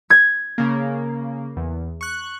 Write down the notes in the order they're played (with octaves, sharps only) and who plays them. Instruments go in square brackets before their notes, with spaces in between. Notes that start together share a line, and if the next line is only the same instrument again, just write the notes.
[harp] G#6
[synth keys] C#3 A#3
E2
C#6 F#6